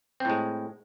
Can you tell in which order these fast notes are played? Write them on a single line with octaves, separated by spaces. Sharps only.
C4 A2 G#3